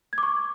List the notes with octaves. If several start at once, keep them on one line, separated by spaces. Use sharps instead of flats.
G#6
D6
C#6